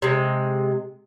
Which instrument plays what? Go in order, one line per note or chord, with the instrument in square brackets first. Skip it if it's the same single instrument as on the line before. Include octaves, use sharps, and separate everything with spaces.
[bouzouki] C3 G#3